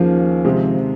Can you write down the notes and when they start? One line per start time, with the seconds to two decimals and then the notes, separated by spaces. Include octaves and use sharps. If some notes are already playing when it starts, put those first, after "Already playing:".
Already playing: D#2 D#3 F3 A#3 C#4 G#4
0.45 C3 D#3 G#3 C4 G4